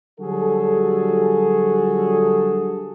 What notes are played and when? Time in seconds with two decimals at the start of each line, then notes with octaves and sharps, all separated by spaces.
0.19 D3 F#3 G3 F#4 G#4 A4